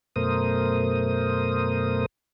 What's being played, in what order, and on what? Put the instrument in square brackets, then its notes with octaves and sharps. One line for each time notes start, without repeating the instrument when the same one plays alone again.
[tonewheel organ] F#2 B2 A3 A#4 C5 D#6